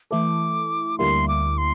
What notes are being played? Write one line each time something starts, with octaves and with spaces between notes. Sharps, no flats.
E3 A3 E4 A4 D6
D2 D3 G3 A#3 E4 C6
D6
C6